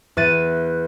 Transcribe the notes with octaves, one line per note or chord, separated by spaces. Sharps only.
E2 F#6 A6 D#7